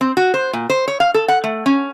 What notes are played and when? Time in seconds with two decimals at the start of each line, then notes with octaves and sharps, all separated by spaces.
0.01 C4
0.17 F#4
0.34 C5
0.53 A#2
0.70 C5
0.88 C#5
1.00 F5
1.14 A4
1.28 F#5
1.44 A3
1.66 C#4